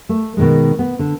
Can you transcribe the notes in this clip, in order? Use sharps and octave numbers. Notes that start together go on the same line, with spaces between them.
A3
B2 D#3 G#3
B3
D3